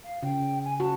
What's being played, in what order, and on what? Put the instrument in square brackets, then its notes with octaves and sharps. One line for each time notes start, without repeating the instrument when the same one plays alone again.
[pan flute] F5
[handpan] C#3 [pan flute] G5
[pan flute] G#5
[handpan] F#4 [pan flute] A5